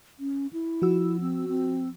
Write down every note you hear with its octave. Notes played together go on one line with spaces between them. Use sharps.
C#4
E4
F3 F#4 E6
C4
C4